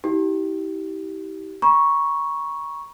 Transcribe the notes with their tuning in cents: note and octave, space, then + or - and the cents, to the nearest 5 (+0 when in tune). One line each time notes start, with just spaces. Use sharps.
E4 -45 G4 -20
A#5 +40 C#6 +0